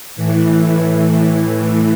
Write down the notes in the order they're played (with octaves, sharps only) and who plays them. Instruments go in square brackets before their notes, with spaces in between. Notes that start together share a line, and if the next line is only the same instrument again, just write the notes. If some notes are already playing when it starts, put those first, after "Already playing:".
[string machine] A2 E3